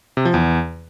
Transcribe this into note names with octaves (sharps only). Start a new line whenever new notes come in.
C3
F3
E2